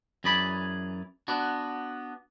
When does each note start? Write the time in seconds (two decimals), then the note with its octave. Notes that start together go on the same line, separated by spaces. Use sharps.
0.24 F#2 E3 G#4 D5 B5
1.28 B3 D4 F#4